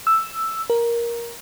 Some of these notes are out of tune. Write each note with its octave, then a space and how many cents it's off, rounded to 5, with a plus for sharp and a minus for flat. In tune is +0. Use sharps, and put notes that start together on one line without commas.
E6 +5
A#4 +10